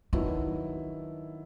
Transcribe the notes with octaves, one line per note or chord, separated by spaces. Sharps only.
D#3 F#3 B3 D4 E4